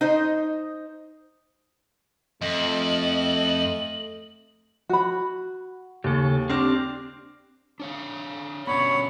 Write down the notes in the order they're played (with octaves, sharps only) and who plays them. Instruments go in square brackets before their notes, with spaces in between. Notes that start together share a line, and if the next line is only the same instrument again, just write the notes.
[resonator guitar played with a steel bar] D#4 C5 D#5
[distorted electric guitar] F2 [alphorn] A3 [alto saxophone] D#5 [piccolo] F#7
[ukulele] F#4 B5
[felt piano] D#2 [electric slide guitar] C#3 A4
[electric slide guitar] C4 D4 G4 [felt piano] D6 F6 A#6
[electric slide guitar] D4 C#5 F5
[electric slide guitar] B2 D3 B3 [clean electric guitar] C#4 D5 B5 [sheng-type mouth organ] C#5